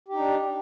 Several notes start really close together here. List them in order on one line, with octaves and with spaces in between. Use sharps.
G4 D#4 D4